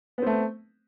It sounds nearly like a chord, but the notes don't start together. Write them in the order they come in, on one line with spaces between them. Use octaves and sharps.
B3 C4 A3